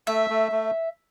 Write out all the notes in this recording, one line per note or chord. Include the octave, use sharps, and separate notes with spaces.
A3 E5
A3
A3